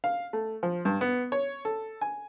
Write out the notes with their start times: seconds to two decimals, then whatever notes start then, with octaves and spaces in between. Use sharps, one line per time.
0.04 F5
0.33 A3
0.63 F3
0.85 G2
1.01 B3
1.32 C#5
1.65 A4
2.01 G#5